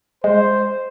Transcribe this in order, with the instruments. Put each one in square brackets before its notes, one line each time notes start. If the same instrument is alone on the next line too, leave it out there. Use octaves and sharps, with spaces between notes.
[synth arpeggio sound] G#3 [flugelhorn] C5